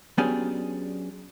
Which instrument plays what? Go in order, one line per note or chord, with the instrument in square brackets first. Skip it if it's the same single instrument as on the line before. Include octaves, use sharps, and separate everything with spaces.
[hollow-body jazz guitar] F#3 B3 C#4 D4 G4 G#4